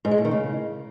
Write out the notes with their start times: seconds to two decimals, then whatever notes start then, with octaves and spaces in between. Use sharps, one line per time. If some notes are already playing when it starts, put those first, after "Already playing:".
0.05 G#2
0.11 G#3
0.18 A2
0.25 D#3
0.31 C#3